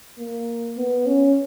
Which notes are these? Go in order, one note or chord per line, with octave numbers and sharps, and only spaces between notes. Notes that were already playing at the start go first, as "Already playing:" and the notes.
A#3
B3
C#4